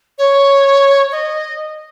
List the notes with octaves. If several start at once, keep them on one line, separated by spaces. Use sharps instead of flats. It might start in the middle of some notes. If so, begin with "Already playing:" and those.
C#5
D#5